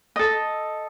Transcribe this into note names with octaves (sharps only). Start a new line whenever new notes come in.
A4 D#5